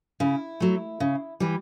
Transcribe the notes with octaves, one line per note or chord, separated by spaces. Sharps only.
C#3 E4
F#3 A3
C#3
E3 G3